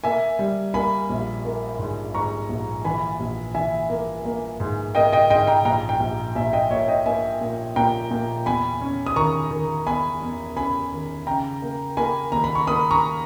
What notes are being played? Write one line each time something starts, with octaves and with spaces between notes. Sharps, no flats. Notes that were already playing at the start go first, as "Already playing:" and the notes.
A#3 E5 G#5
G3
A#3 G#5 B5
A#1
A#3
G#2
G#2 A#5 C#6
A#1
E3 G#5 B5
A#1
E3 E5 G#5
A#3
A#3
G#2
A#3 D#5 G5
D#5 G5
G#2 D#5 G5
G5 A#5
A#1 G5 A#5
G5 A#5
A#1
A#1 E5 G#5
D#5 G5
A#2 C#5 E5
D#5 G5
A#3 E5 G#5
A#2
A#2 G5 A#5
A#2
E2 G#5 B5
C#4
D#6
D#3 A#5 C#6
D#3
E2 G#5 B5
E2
C#4 G#5 B5
D#3
C#3 G5 A#5
A#3
A#3 G#5 B5
D#2 A#5
B5
C#6
A#3 B5 D#6
A#5 C#6